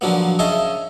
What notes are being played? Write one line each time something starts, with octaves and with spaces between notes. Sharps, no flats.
D3 F3 F#3 A#3 B3
C#3 C#4 D#5 E5 A5 C6